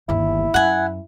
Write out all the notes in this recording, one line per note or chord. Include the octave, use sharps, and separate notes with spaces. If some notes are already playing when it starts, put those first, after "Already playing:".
G1 D#2 E4
F#2 F#5 G#5